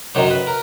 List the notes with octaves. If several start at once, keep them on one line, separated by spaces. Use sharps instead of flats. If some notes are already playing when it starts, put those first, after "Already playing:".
F#2 D#3 F#3 C5
B4
A#4